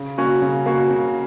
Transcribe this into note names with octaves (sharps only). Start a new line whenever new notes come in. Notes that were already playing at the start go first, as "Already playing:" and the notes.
Already playing: C#3
A#3 C#4 F#4
C#3
A#3 C#4 F#4
C#3